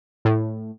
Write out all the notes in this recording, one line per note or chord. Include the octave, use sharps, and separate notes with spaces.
A2